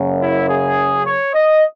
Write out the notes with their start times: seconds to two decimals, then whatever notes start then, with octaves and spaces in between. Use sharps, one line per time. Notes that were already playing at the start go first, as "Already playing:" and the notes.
Already playing: F#1 F#2 C#3
0.22 E4
0.49 G#4
1.05 C#5
1.34 D#5